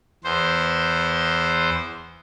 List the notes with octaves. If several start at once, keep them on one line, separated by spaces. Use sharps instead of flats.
E2 C5